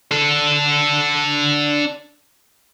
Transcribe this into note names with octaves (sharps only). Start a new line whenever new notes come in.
D4 A4